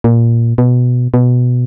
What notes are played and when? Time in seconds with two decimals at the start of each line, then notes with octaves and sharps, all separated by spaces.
0.04 A#2
0.58 B2
1.14 B2